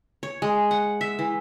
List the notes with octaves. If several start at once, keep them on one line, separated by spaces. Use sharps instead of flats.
C#5
G#3
F#5
E5
E3